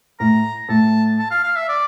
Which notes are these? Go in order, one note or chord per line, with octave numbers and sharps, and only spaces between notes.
A2 A#5
A2 A5
A5
F5
F5
E5
D5